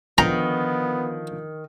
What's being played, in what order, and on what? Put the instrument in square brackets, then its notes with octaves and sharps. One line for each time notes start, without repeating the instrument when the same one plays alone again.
[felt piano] D3 F3 [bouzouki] D#3 [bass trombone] B3 [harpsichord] A#5